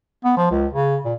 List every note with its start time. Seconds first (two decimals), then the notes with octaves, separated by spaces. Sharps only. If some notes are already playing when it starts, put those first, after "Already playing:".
0.25 B3
0.37 F3
0.51 C#2
0.73 C#3
1.05 A#2